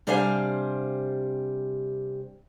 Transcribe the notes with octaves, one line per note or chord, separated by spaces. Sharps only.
C3 G3 D4 C5 F5 G#5